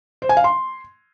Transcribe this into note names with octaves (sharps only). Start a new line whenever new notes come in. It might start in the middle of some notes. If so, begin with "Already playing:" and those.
C5
G#5
F5
C6